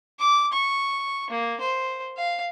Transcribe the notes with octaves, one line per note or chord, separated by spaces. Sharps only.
D6
C#6
A#3
C5
F5